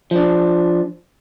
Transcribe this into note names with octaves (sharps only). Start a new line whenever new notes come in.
F3 D4